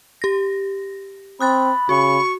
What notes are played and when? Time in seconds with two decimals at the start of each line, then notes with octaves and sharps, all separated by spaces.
0.22 G4 A#6
1.41 C4 B5 D#6 F#6 A6
1.89 C#3 F#4 C#6